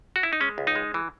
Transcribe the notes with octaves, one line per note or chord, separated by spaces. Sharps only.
F#4
E4
D#4
G#3 C#4
C#2
D#4
G#3
E3